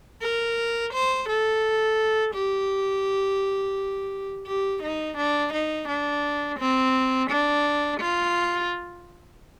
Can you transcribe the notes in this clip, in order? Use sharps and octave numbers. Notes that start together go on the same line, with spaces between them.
A#4
C5
A4
G4
G4
D#4
D4
D#4
D4
C4
D4
F4